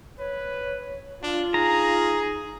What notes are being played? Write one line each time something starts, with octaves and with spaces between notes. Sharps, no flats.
B4 C#5
D4 F4
D#4 G#4 A#5